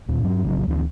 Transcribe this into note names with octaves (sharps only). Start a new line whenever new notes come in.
D1 D#2 A#2
G2 F#3
A#1 C#3 F#3
D2 E3 G#3 C4